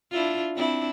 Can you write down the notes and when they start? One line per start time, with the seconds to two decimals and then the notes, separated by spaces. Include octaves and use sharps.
0.11 D4 E4 F4
0.56 C4 D4 E4